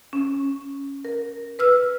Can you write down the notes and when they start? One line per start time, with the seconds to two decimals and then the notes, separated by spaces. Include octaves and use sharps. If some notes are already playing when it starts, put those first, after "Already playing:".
0.13 C#4
1.05 A#4
1.59 B4 E6 F6